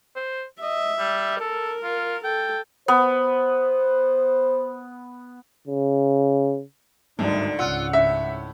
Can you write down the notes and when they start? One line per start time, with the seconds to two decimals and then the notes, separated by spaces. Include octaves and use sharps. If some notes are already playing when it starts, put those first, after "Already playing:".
0.16 C5
0.62 D#5 E5
0.99 G3
1.40 A4 A#4
1.83 F4
2.24 A4 G5
2.88 B3 C5
5.68 C#3
7.19 G#1 D2 G2 D3 D#4
7.59 C#2 G#2 F4 F#5 E6 F#6
7.93 A2 E5